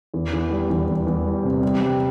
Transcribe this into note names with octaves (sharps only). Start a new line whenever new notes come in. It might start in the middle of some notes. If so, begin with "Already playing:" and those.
E2
E2
G3
E2
E2
E2
G3
C3
G3
G3